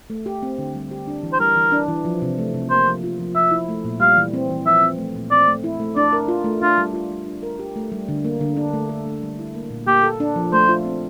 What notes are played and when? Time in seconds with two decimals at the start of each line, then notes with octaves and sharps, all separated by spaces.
0.10 A3
0.26 G4
0.43 C4
0.58 D3
0.75 G3
0.91 G4
1.08 D4
1.23 E3
1.33 C5
1.40 G3 A#4
1.56 E3
1.72 D4
1.88 E3
2.05 F3
2.22 C3
2.38 A3
2.54 C3
2.70 A#3 C5
2.87 F3
3.03 F4
3.19 F3
3.36 F3 E5
3.51 E4
3.68 A3
3.85 A#2
4.00 G3 F5
4.17 E3
4.34 C4
4.50 E3
4.66 F3 E5
4.82 C4
4.98 A3
5.15 A#2
5.31 C4 D5
5.48 A3
5.64 E4
5.80 A3
5.96 D4 D5
6.13 A#4
6.28 F4
6.44 A3
6.62 D4 F4
6.78 G3
6.93 F4
7.11 G3
7.26 D4
7.43 A#4
7.59 G4
7.76 A3
7.92 G3
8.09 D3
8.25 A#3
8.41 D3
8.57 D4
8.73 A3
8.89 A4
9.06 A3
9.23 G3
9.39 E4
9.55 A#3
9.70 A#2
9.87 A#3 G4
10.03 A4
10.20 D4
10.36 F3
10.53 A3 C5
10.69 F4
10.84 C4